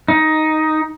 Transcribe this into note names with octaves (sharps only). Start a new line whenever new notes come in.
D#4